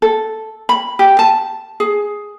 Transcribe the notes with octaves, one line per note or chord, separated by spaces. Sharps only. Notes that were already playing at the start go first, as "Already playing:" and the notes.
A4
B5
G4
A5
G#4